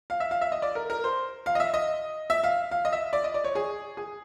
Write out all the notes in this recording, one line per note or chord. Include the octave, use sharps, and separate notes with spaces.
F5
E5
F5
E5
D#5
D5
A#4
A#4
C5
F5
D#5
E5
D#5
E5
F5
F5
D#5
E5
D5
D#5
D5
C#5
G#4
G#4